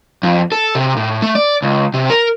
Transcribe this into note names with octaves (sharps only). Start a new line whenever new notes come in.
F2
A4
C3
A2
A3
D5
C#2
C3
A#4